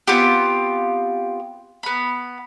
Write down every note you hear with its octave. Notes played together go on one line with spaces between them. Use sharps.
B3 C4 F4 G4
B3 B5